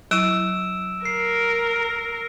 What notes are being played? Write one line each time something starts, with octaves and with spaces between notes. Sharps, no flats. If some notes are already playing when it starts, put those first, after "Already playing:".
F#3 E4 E6 D7 E7
A#4 C7